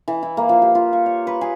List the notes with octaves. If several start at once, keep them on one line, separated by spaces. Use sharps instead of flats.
E3
E4
A#3
F3
G4
F4
C#6
C#5
B4
G#4